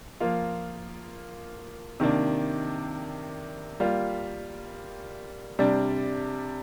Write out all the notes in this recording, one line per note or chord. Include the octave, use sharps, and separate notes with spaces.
F3 A#3 F4
C3 D#3 A#3 D4
G3 A#3 F4
C3 G3 D4